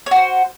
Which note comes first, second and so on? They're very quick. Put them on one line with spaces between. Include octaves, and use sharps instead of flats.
C#5 F#4 C5